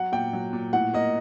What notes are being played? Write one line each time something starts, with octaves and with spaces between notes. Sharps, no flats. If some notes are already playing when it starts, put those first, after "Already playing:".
Already playing: F#3 F#5
A#2 G5
F#3
A#2
A2 F#5
A#3 D#5